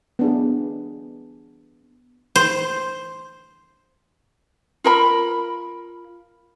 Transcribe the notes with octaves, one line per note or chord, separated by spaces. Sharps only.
B3 D4 G#4
C5
F4 A#4 B5